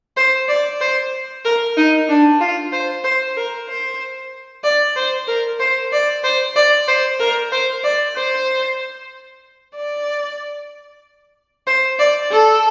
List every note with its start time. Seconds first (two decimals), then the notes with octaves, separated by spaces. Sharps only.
0.17 C5
0.48 D5
0.81 C5
1.45 A#4
1.77 D#4
2.09 D4
2.41 F4
2.72 C5
3.04 C5
3.36 A#4
3.68 C5
4.64 D5
4.96 C5
5.28 A#4
5.60 C5
5.92 D5
6.24 C5
6.56 D5
6.88 C5
7.20 A#4
7.52 C5
7.84 D5
8.15 C5
9.75 D5
11.67 C5
11.99 D5
12.31 A4